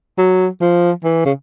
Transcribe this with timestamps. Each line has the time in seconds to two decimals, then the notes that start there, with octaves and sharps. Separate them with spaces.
0.18 F#3
0.61 F3
1.04 E3
1.25 C#3